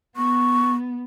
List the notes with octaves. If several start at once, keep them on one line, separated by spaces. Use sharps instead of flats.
B3 C#6